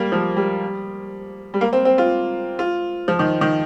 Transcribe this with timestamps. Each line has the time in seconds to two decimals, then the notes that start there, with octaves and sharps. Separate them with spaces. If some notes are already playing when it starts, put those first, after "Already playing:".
Already playing: G3 A#3
0.12 F3
0.37 G3
1.54 G3
1.61 A#3
1.73 C4
1.85 C4
1.98 F4
2.59 F4
3.08 F3
3.19 D#3
3.41 D#3